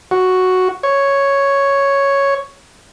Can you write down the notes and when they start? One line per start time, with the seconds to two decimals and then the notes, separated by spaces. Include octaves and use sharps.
0.11 F#4
0.83 C#5